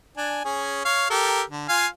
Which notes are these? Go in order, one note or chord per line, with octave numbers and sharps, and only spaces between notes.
D4 G#5
C#4 G#4
C#5 F5
G4 A4 A#4
D3
F4 F5 G#5